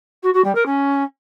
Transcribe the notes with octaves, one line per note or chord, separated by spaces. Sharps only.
F#4
F#4
G3
A#4
C#4